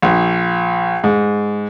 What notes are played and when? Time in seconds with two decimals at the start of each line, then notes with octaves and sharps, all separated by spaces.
0.02 A#1
1.04 G#2